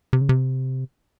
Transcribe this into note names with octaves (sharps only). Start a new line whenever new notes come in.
C3
C#3
C3